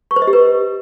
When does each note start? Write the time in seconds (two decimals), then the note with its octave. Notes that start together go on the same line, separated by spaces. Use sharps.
0.11 C#6
0.16 C5
0.22 D#5
0.27 G4
0.33 B4